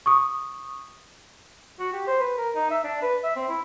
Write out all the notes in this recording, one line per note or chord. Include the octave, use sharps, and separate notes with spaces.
C#6 D#6
F#4
G4
C5
B4
A#4
D#4
E5
D4
B4
E5
C4
E4